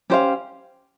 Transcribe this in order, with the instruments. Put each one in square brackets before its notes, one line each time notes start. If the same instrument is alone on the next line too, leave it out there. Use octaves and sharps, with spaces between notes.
[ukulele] C#4 G4 C5 F5